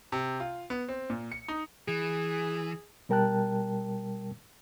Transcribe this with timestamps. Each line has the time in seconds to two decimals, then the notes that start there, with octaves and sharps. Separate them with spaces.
0.12 C3
0.40 F4
0.70 B3
0.89 C4
1.10 A#2
1.32 C#7
1.48 D#4
1.88 E3 G#4
3.09 B2 G3 A#4 G5 A5 F#6